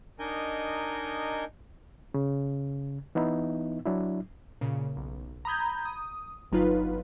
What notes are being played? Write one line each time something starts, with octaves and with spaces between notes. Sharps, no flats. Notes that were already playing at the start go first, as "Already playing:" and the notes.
D4 D#4 A#4 D#5 G#5 G6
C#3
E3 B3 D#4 E4
F#3 D4 E4
A#2 C#3
B1
A#5 B5 D#6 G6 G#6
D#6
G1 F#3 D#4 F4 B4